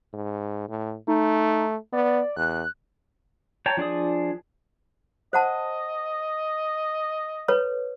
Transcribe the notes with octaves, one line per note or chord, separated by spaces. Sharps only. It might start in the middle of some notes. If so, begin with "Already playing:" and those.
G#2
A2
A3 D#4
B3 D5
E2 F#6
C#5 G5 A5 A#5
F3 D4 G#4 D5 D#6
C5 D#5 F#5 A5
A4 B4 C#5